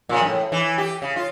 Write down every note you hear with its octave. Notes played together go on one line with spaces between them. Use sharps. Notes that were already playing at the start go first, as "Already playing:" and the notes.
A#2 C#3
F#2 A2
E3
G4
C#3
F4